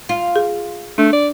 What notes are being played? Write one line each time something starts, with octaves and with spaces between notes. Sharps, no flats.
F4
G#4
A3 D4
D5